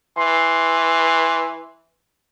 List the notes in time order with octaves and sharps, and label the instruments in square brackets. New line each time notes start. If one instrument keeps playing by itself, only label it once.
[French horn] E3 [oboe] C6